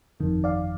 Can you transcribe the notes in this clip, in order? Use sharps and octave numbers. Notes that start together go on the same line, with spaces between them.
G1 F2 D#3
D5 F5